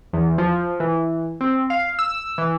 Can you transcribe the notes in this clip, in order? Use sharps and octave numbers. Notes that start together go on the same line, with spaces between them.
E2
F3
E3
C4
F5
E6
E3